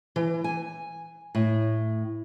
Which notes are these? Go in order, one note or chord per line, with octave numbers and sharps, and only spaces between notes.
E3
G#5
A2